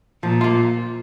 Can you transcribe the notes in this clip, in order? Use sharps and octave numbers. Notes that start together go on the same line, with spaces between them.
A#2 F3
A#3 F4